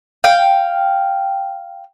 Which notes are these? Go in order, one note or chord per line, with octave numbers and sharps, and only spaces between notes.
F5 G5